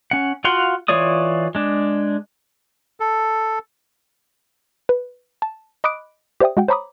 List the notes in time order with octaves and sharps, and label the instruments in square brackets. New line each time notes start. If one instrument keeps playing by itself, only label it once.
[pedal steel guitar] C#4 F#5
F4 F#4 F5 F#5 C6
E3 F4 C#5 D5 D#6
G#3 D4
[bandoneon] A4
[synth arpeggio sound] B4
A5
D#5 B5 D6 D#6 F#6 D7
G4 C5 D5 E5 G5 D#6
G#3 F#4 F#5 G5
C5 C#5 A#5 B5 D6 D#6